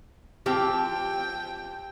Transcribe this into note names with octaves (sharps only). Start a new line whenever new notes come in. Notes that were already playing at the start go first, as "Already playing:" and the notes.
F3 C4 G4 G5